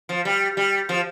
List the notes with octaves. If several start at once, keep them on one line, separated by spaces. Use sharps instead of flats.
F3
G3
G3
F3